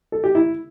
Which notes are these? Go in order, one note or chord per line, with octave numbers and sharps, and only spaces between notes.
A4
G4
E4